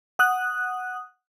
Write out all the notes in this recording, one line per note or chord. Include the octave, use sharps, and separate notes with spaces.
F#5 D#6 F#6